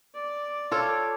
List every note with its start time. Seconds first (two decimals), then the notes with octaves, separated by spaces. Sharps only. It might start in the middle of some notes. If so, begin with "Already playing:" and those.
0.15 D5 D6
0.71 F4 A4 C#5